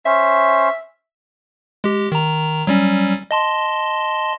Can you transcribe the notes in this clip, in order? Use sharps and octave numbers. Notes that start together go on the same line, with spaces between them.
C#4 C5 E5
G#3 G4
D#3 A#5
F#3 G3 C#4
D#5 A5 C6